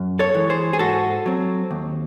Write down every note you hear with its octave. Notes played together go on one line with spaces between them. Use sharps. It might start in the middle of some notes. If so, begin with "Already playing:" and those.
Already playing: F#2
A4 C#5
E3 G#3
G#4 C5
G#4
G#2 F#4 A4
F#3 C4
D#2